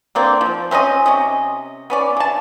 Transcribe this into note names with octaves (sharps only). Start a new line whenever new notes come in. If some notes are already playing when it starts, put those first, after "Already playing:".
D3 A#3 C4 D5
F3
C4 C#4 A#4 D#5
C3 C#4 D#5
B3 C#4 D5
C#3 A5